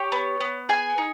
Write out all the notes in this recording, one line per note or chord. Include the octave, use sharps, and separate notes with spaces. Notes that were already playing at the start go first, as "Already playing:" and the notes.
Already playing: G4 C#5
B3
B3
G#4 G#5
D#4